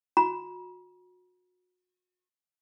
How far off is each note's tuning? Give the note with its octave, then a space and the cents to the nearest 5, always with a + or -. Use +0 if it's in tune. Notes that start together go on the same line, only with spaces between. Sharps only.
F#4 -35 A#5 +45